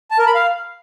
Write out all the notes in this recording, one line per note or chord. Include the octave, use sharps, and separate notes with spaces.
A5
A#4
B5
F5